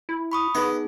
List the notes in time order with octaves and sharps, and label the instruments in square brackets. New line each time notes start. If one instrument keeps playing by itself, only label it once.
[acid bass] E4
[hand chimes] B5 C#6 D#6
[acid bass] B3 [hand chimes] D#4 G#4 [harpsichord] B4 D#5